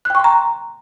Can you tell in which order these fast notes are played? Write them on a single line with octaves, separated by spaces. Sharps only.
F#6 G5 C#6 C6 A#5